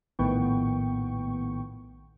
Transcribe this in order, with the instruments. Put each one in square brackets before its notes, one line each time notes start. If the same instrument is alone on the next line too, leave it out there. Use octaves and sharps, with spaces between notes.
[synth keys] A#1 A2 D#3 B3 G5 C#6